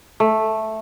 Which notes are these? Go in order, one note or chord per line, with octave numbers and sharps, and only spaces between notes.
A3